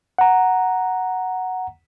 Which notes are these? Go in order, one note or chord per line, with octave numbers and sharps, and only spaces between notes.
F#5 A#5